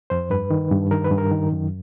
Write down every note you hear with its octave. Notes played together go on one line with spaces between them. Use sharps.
F2 C5
G2 B4
D#3
G2
D#3 A#4
B4
G2
A#4
D#3
F#2